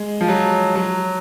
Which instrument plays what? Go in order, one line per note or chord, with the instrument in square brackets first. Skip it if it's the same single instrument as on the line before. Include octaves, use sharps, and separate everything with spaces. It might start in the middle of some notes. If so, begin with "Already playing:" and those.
Already playing: [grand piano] G#3
F3
F#3
F#3